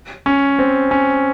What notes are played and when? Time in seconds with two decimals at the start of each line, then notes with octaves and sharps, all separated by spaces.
0.26 C#4
0.59 C4
0.91 C#4